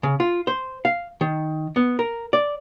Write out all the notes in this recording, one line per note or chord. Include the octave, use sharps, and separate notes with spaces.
C#3
F4
C5
F5
D#3
B3
A#4
D5